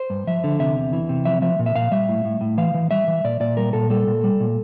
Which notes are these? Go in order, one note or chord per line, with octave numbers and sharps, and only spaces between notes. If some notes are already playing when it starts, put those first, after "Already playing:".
Already playing: C5
G2
F3 E5
D3
C3 E5
E2
E3
C3
F3 E5
F3 E5
A#2
E5
A#2 F5
G3 E5
A2
A2
A2
E3 F5
E3
G3 E5
E3
A#2 D5
A#2 D5
G3 A#4
A#2 A4
G3 A4
A#2
G3
A#2